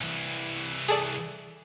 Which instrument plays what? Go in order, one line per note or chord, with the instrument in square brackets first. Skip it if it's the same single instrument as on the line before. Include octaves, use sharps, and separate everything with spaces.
[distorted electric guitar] C2 E3
[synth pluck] G#4 A4 D5